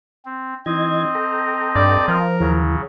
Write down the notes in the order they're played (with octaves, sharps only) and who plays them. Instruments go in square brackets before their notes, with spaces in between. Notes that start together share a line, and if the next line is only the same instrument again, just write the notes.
[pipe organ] C4
[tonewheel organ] E3 D#4 G#6 [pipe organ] C4 D#5
[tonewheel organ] A4 G5 A#5
[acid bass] G2 [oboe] D5
[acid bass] F3 [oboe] A#4
[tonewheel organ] D#2 E3 [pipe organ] C#3 F#3